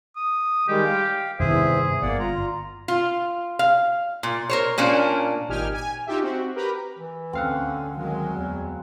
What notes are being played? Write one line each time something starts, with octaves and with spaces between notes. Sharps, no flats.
D#6
D#3 G3 G#3 G4
F5 G5
E2 G2 C3 D#3 G#4 C5 E5
G1 A#3 D5 F#5
F4 A#5
F4
F5
A#2
A#4 C5 C#5
A#2 A#3 C#4 D4
G#1 A#2 D#4 G4 G#5 F6
G#5
D#4 F4 G4 E5
C4 F#4
G4 A#4 B4 B5
E3
D2 D3 C4 C#4 F5 F#5
D#3 F#3 G#3
E2